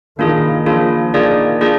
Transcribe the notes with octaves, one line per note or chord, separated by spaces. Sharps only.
D#3 A#3 D4 F4 G#4
F3 A#3 D4 F4 G#4
D#3 A#3 D4 F4 G#4 D5
A#3 D4 F4 G#4 D5